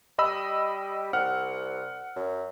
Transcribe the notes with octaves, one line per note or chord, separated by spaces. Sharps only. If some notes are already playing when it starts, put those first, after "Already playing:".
G3 D#5 B5 E6
C2 F#5 F6
F#2